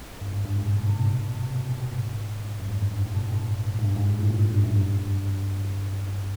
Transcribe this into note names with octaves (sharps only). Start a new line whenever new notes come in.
G2
G#2
G2
G#2
A#2
B2
C3
A#2
B2
B2
C3
B2
B2
A#2
A2
G#2
F#2
G#2
G2
G2
A2
B2
A2
G#2
G2
G#2
G#2
A2
A#2
G2
F#2
G2